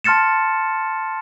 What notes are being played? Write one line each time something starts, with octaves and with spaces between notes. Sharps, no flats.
A5 C6 F6 A6 C#7 E7